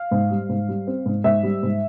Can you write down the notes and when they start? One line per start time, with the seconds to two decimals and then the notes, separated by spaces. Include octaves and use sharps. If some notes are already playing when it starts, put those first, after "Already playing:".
Already playing: F5
0.11 G#2
0.31 G3
0.49 G#2
0.69 G3
0.87 C4
1.06 G#2
1.24 G#2 E5
1.43 G3
1.63 G#2